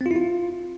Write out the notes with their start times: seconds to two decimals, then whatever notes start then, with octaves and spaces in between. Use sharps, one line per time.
0.01 C4
0.06 F4
0.11 E4
0.16 F4